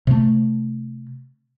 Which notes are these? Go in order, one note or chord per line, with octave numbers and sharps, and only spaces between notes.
C3 A3